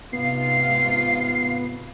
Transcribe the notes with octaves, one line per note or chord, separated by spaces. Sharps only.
G#2 C3 B3 F4 C7